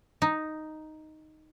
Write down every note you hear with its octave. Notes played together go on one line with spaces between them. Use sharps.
D#4